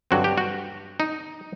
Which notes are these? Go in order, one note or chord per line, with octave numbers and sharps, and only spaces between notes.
G2 D3 F#3 C4 F#4
G4
F#4
D#4